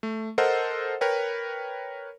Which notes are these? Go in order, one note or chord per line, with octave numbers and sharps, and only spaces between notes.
A3
A4 A#4 C5 D#5 F#5
A#4 B4 C#5 G5